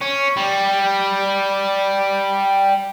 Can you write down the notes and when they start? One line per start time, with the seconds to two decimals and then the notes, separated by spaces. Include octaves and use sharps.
0.02 C#4
0.37 G3